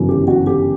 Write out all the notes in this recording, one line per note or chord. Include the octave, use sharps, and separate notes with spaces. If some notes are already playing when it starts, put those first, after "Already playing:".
Already playing: G1 F#2 C#3 E3
G4
F#4
G4